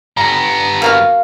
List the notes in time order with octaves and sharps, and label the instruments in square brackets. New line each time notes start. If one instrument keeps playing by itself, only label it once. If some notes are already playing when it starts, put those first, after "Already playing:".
[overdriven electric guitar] G2 B3 [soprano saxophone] A#5
[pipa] A#3 F#4 F5